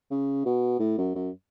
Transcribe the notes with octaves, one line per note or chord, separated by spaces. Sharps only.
C#3
B2
A2
F#2
F#2